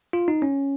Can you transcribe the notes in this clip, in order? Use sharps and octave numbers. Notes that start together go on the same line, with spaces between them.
F4
D#4
C#4